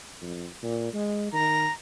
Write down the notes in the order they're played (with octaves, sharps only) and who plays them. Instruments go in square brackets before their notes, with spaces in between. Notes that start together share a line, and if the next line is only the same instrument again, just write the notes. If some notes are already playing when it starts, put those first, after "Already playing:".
[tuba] F2
A#2
G#3
[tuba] D#3 [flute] A#5